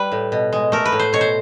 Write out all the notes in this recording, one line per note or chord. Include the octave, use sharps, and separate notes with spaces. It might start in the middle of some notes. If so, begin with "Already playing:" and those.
Already playing: G3 B4
A2
B2
G#3
A3 A#4
B4
A2
C5
B2 C#5
C5